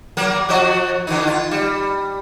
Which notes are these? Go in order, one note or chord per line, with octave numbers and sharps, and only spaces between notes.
F#3 A#3 A#4
F3 F#4 D#5
D3 E3 D#4
F4
G3